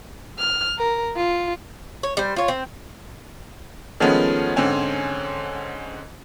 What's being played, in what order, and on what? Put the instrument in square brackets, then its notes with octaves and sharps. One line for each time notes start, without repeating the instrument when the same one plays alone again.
[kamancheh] F6
A#4
F4
[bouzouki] C#5
G3 C5
F4 C#5
C4
[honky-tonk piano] D#3 F3 G#3 A3 B3 C#4
G#2 D3 C4 C#4 G#5